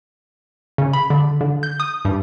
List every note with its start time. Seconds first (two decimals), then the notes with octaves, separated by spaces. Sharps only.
0.78 C#3
0.93 B5
1.10 D3
1.41 D3
1.63 G6
1.80 D#6
2.05 G2